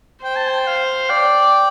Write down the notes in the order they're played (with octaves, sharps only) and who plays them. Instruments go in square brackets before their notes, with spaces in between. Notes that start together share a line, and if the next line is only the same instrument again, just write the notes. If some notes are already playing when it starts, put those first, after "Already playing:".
[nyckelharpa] C5 [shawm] G5
[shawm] A5
G5
F5
[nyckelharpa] D5 [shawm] G5